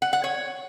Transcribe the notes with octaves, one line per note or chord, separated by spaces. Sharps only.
F#5
F#5
C#5